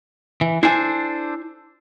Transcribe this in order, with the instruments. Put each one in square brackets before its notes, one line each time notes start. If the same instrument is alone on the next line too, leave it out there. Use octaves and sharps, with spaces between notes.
[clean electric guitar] E3
[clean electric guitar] D4 A4 C5 [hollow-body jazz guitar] E4 G#5